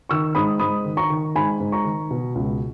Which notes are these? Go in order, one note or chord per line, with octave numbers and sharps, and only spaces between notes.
D#3 C#6 E6
G#2 B5 D#6
G#2 B5 D#6
D#3
A#5 C#6
D#3
G#2 G#5 B5
G#2
A#5 C#6
D#3
B2
C#2